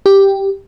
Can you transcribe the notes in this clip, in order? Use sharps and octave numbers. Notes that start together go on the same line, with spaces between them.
G4